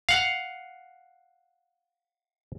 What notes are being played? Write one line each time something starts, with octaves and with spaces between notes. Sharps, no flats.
F5 F#5